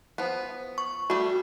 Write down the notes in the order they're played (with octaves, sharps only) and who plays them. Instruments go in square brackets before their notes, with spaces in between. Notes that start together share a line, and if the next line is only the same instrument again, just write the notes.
[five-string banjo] F3 B3
[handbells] C#6
[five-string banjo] G3 A3 [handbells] F#4